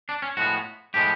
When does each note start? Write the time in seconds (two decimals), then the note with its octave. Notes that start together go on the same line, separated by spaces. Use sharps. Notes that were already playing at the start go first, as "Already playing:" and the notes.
0.09 D4
0.22 C#4
0.37 A2 F3 G#3 B3 F#4
0.94 A2 F3 G#3 B3 G4